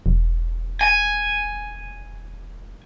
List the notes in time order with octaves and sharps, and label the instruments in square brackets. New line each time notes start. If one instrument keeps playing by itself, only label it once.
[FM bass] E1
[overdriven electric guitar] G#5